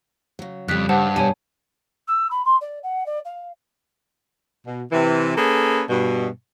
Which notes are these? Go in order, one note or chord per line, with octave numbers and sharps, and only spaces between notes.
C#3 F#3
F2 C#3 G3 F#6 B6
G2 C5 F#5 A5
B2 G3 C#5 G#5 A5
E6
B5
C6
D5
F#5
D5
F5
B2
C3 E3
A#3 C#4 G#4 A4 B4
G2 B2